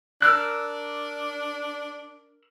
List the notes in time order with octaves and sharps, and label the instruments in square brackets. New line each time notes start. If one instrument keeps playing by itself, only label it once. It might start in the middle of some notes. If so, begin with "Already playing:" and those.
[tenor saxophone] D4 [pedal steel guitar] A#4 E6 F#6